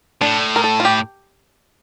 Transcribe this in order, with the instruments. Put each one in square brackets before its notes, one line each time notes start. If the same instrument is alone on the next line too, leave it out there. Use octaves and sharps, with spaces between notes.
[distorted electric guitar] A2 [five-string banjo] D4
[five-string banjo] A#4
A4
F4
G4